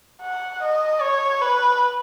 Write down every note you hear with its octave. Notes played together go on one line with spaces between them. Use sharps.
F#5
D#5
C#5
B4